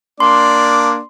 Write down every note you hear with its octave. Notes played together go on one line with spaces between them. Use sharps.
A#3 D4 D5 C6